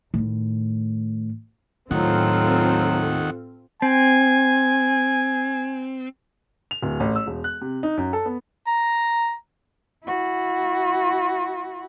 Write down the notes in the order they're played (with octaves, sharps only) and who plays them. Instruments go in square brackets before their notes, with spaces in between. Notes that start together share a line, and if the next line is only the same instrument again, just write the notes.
[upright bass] A2 D#3
[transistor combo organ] D#2 D#3 F#5 [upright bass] A2 [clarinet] F#3 [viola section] C4 F4 A4
[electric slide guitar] C4 [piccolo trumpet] G#5
[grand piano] F7
D1
A1
E6
E1
F#6
C3
D#4
F#2
A4
B3
[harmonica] A#5
[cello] E4 F#4